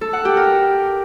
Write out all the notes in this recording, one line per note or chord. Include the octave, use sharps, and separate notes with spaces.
A4
F#5
G4
A#4